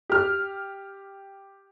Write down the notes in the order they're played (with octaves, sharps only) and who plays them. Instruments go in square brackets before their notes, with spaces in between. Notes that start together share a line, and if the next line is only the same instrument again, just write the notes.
[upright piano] G4 F6